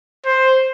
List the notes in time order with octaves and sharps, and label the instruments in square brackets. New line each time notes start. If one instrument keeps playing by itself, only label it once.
[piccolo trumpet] C5